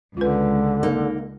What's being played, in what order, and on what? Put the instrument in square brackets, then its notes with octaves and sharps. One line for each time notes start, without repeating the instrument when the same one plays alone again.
[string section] C#2 [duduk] D3 [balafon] F4 B4
[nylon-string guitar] A#3 D#4